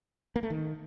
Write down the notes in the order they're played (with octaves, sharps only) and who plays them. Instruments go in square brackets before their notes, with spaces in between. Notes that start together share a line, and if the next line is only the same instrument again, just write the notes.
[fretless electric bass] A#3
A3
D#3